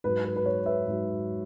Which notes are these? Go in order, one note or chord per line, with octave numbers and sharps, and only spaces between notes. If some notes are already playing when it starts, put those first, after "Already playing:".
G#2 F#3 B4
B4
B4
C#5
B4 E5
G#2 F#3